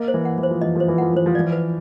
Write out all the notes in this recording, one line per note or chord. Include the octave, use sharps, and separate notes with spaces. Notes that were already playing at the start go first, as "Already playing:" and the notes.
Already playing: A#3 D#5
C5
E3
F#5
E3
C5
F3
E3 D#5
F3 C5
E3
F3 F#5
E3 C5
F3
E3 D5
B4